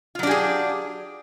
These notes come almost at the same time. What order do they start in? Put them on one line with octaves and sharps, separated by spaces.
F4 F#3 D4 G4 G#4